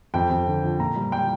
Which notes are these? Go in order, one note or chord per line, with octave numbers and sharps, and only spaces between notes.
F2 G5
F2
D3
F3
A#2 A#5
G3
G3 G5